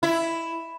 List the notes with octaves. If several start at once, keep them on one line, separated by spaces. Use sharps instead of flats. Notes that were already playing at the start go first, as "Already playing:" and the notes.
E4